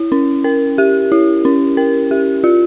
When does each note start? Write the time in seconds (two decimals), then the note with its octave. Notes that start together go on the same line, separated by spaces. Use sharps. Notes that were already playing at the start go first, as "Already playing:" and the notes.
Already playing: E4
0.12 C#4
0.44 A#4
0.78 G4
1.12 E4
1.45 C#4
1.77 A#4
2.11 G4
2.44 F4